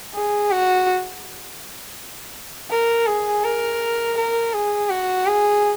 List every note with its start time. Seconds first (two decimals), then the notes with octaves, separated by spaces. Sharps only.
0.14 G#4
0.51 F#4
2.70 A#4
3.07 G#4
3.44 A#4
4.17 A#4
4.53 G#4
4.90 F#4
5.27 G#4